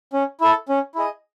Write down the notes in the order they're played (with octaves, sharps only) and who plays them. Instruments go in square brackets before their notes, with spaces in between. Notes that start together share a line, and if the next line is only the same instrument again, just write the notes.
[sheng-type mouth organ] C#4
E4 A4
C#4
E4 G#4 D#5